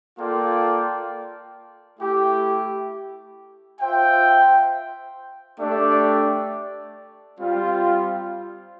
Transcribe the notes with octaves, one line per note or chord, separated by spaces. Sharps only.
A#3 F4 A4 D5 G5
A3 E4 G4
F4 C5 E5 G5
A3 D4 G4 D5
G3 C4 F4